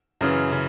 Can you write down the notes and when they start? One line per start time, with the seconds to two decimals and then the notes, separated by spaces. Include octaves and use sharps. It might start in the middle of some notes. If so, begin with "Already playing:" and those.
0.21 F#2 C#3 E3
0.52 C#3